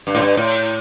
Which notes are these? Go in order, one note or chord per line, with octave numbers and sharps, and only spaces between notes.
G2
A2
G2
A2